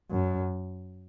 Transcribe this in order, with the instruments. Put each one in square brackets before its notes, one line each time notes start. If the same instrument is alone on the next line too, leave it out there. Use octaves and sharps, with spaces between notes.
[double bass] F#2